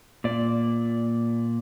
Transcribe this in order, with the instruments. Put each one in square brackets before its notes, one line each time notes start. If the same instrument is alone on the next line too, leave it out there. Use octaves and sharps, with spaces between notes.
[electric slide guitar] A#2 D5